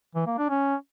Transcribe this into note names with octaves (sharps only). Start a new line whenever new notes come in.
E3
A#3
D4
C#4